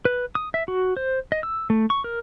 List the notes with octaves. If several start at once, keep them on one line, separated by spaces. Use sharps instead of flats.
B4
D#6
E5
F#4
C5
D#5
E6
A3
C#6
A#4